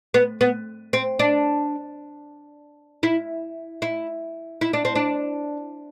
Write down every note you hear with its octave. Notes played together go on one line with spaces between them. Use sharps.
B3
B3
C4
D4
E4
E4
E4
D4
C4
D4